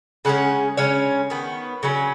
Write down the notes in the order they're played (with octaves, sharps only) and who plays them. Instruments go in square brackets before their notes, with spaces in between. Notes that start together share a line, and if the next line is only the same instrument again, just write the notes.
[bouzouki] C#3 G#3 C#4 F#5
C#3 G#3 C#4 C#5
D#3 B3
C#3 F#3 C#4